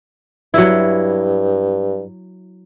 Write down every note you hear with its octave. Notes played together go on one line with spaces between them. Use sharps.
G2 F#3 E4